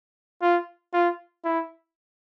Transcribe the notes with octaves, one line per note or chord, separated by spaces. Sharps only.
F4
F4
E4